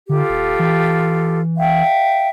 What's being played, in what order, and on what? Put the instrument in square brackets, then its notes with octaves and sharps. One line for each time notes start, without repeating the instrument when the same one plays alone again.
[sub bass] D3 [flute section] F4 G4 A4
[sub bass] D#1
E3
[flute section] E5 F5 G5